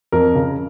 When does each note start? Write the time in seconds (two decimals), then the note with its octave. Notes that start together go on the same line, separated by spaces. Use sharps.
0.12 F2 A#4
0.35 C#3